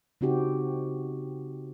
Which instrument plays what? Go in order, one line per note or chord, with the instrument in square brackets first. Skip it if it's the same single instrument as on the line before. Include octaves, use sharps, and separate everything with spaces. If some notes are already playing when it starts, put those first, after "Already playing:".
[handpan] C#3 C4 D#4 F#4 G4